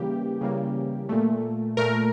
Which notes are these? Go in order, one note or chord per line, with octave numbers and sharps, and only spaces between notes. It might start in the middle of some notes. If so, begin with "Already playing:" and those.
Already playing: C#3 E3 G3 A#3 G4
C#3 E3 G3 A#3
A#2 A3
A#2 A3 A#4